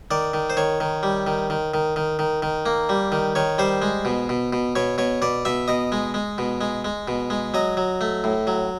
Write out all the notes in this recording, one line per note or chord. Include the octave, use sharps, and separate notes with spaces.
D#3 D5
D#3
C5
D#3 C#5
D#3
G3
D#3
D#3
D#3
D#3
D#3
D#3
A#3
G3
D#3
D#3 C#5
G3 C5
G#3
B2
B2
B2
B2 C#5
B2 C#5
B2 D5
B2 E5
B2 D#5
G#3
G#3
B2
G#3
G#3
B2
G#3
F#3 D#5
F#3
A3
A2
F#3